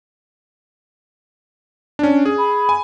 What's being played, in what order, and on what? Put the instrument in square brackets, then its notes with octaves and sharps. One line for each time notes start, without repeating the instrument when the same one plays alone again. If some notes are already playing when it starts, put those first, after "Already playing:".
[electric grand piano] C#4 D4
G#4
[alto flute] B5
[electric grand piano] G#5